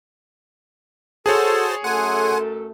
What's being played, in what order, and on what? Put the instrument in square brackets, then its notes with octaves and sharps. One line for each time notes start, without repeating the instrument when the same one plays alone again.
[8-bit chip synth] F#4 C5 A5 [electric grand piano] G#4 C#5 [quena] A4
[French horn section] F#2 A3 A4 [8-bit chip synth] F#5 G#5 [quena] C6